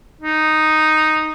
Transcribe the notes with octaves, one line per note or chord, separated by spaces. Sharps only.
D#4